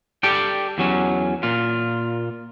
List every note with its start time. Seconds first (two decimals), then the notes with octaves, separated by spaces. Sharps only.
0.23 G4 A4 D5 G5
0.78 E2 F#3 C#4
1.43 A#2 F4